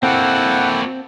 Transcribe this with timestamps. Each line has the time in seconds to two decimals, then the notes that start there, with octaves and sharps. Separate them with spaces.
0.03 A#3 C4 E4 F#4 A4 F#5 G5